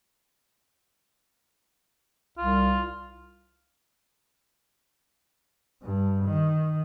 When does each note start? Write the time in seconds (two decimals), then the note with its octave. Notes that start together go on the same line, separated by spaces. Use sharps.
2.38 C2 F4
5.82 G2
6.24 D#3